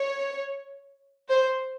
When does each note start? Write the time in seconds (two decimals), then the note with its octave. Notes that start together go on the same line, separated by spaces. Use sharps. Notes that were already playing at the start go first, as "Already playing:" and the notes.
Already playing: C#5
1.29 C5